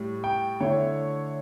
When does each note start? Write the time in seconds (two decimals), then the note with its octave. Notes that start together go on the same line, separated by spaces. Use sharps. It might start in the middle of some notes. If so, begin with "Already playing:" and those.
Already playing: A2 G3
0.24 G5
0.60 D3 A3 E4 C#5